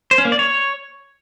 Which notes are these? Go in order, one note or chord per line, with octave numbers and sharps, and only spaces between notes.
C5
C#4
A#3
D5
C#5